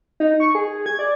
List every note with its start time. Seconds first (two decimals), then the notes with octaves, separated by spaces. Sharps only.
0.20 D#4
0.40 C#6
0.55 G#4
0.86 G#6
0.99 D5